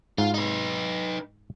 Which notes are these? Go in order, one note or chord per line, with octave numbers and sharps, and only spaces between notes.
G#2 F4
D#4 B4